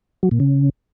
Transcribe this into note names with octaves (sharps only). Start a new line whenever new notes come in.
F#3
A#2
C#3